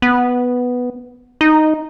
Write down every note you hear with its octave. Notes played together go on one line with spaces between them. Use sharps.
B3
D#4